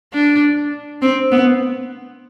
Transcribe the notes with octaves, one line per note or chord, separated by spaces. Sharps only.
D4
C4
B3